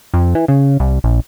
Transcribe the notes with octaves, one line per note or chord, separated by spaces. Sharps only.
F2
E3
C#3
C2
A#1